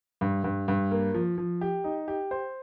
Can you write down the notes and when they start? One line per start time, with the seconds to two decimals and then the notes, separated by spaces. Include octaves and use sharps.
0.21 G2
0.44 G2
0.68 G2
0.91 A#3
1.14 F3
1.38 F3
1.61 G4
1.84 D#4
2.08 G4
2.31 C5